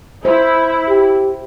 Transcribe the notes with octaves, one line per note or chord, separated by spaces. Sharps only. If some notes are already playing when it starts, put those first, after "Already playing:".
E4 C5
G4